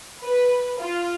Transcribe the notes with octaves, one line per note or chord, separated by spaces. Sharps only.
B4
F4